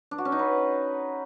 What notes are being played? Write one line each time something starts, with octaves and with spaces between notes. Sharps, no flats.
D4
F#4
C#4
D#4
B4